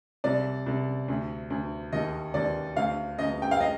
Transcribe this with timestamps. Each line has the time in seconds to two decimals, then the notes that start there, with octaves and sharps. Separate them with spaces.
0.24 C2 D5
0.66 C2
1.08 D2
1.50 D2
1.93 D#2 D#5
2.34 D#2 D5
2.76 D2 F5
3.19 D2 D#5
3.42 G5
3.51 F5
3.61 D#5